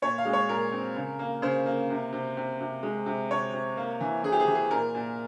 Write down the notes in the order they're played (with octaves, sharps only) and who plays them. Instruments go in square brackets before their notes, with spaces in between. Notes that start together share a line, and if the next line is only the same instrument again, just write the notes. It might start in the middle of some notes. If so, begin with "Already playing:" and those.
[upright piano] A#2 C#5
F5
G#3
C#5
A#2 A#4
C4
C#3
A#3
C#3 C5
A#3
C3
C3
C3
C3
G#3
C3
C3 C#5
C3
A#3
E3
E3 G#4
G4
G#4
E3
G#4
A#2 A#4
A#2